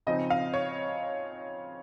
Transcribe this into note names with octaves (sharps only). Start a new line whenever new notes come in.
C#3 F3 C4 D#4 D#5
F5
C#5